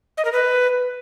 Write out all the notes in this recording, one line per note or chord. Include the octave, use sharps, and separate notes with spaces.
D#5
A#4
B4